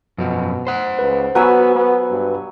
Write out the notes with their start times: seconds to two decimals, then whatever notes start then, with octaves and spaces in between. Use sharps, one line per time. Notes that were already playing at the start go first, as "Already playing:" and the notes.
0.18 F#2 B2 F3
0.67 C5 F#5
0.99 C#2 B4
1.35 F#3 B3 F#4 B4 G#5 E6
1.75 B3
2.11 G2